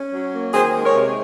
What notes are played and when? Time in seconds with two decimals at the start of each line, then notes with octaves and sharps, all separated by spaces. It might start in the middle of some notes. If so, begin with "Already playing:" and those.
Already playing: C#4
0.12 F#3
0.33 A#3
0.53 D#3 G#4 C5
0.74 G#3
0.84 A#4 C#5
0.95 C3